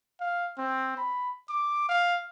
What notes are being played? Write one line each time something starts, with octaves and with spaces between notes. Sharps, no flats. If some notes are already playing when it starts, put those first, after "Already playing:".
F5
C4
B5
D6
F5